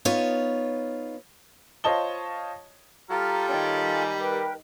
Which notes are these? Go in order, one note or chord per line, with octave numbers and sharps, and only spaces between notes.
B3 D#4 F4 C#5
F4 C5 C#5 D#5 A5 G7
G3 F4 G4 A4 A#5 F6
D#3 C#5 G5
G#5
A#4 B4 G5